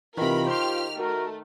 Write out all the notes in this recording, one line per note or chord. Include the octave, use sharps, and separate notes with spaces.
C3 D#3 E3 F4 A#4 B5
G4 C5 C6 F6
A3 F#4 A#4